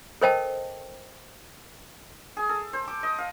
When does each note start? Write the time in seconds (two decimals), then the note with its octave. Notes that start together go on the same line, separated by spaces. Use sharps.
0.22 A4 A#4 C5 D#5 G5 A5
2.37 G#4
2.49 A4
2.73 C5
2.88 D6
3.03 D#5
3.19 F5